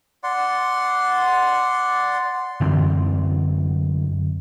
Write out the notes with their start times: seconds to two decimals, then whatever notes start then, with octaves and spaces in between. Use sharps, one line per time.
0.24 D5 F#5 C6
2.60 F#2 D3 E3 C4